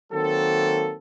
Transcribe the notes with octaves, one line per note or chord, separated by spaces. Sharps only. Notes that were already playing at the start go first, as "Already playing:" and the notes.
D#3 F#3 A#3 C4 A4